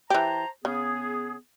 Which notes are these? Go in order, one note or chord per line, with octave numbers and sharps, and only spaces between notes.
E3 G4 C5 A5 A#5
C#3 B3 G#4